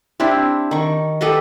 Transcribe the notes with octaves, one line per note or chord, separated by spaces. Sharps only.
C4 D4 E4 G4
D#3 C#6
G4 A4 B4 D#5